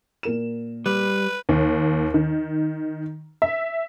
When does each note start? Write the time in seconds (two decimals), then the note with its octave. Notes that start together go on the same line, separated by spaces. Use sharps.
0.23 A#2 A#4 E7
0.86 G3 B4
1.49 D#2
2.14 D#3
3.42 E5